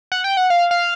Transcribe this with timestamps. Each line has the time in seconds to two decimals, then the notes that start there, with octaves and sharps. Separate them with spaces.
0.12 F#5
0.24 G5
0.37 F#5
0.50 F5
0.71 F5